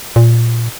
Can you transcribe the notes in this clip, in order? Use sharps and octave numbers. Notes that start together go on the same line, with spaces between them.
A#2